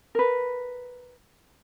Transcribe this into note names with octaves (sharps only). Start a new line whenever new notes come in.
A#4 B4